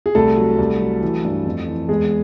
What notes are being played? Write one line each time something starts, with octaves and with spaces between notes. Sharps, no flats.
G#4
C2 A3 A4
F#3
C2
F#3
E3
G2
F2
E3
E2 G#3 G#4